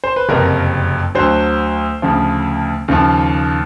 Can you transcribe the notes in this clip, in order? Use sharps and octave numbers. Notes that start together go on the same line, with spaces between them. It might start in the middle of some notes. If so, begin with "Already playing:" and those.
C5
B4
F#1 F2 C3 A#4
D2 D3 F#3 C5
D2 C#3 F3
D#2 C#3 F3